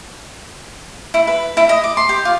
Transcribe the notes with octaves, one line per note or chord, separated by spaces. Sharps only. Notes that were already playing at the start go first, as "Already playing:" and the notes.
E4
B4
E4
D#5
D6
C6
G4
F4